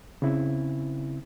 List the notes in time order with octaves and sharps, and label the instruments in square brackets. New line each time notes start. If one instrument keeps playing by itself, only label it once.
[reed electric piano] C#3 C4 E4